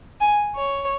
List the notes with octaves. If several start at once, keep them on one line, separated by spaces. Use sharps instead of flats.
G#5
C#5